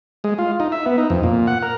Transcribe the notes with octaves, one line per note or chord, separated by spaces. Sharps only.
G#3
F4
D#4
E5
B3
D#4
F2
A#2
F#5
A#4